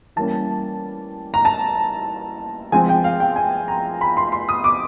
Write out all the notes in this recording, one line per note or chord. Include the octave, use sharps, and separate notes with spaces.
E3 G3 A#3 C#4 A5
A#5
A5
F3 G#3 C4 G#5
G5
F5
G5
G#5
A#5
B5
C6
C6
D#6
D6